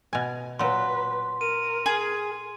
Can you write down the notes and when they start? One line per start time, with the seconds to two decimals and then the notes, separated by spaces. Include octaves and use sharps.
0.13 B2 G#5
0.59 A#2 F#3 B4 C6
1.41 A#4 D#7
1.86 G#4